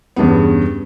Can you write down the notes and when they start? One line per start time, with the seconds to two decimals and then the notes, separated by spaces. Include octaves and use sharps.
0.16 E2 G2 C#3 B3